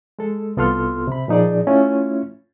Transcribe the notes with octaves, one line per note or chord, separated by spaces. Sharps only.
G#3 A4
C2 B3 F4 A4 C6 F6
C3 B5
A#2 F3 D#4 G#4 D5
A3 C#4 E4 F4